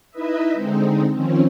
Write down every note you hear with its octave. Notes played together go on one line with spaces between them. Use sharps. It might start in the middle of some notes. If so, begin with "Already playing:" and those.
D#4 E4 B4 D#5 E5
D3 G#3 C4 D#4
D#3 F3 C4 C#4